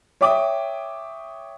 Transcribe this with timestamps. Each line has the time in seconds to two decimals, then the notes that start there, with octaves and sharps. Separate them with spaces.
0.21 C#5 E5 G5 D6 D#6